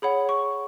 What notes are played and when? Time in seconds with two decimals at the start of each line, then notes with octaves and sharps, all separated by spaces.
0.02 G#4 C#5 F#5 B5
0.29 C#6